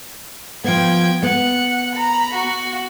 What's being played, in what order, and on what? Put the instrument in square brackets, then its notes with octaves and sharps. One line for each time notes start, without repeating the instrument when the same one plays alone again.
[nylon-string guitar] F3 B3 [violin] G5 G#6
[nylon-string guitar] B3 [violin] F#5
[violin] A#5 B5
F#4